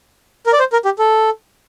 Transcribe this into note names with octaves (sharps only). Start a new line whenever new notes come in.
A#4
D5
C5
A#4
G4
A4